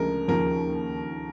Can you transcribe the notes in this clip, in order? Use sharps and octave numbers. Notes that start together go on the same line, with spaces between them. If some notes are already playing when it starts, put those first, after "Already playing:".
Already playing: D2 C#3 F3 G#3 A#4
D#2 C#3 F3 A#4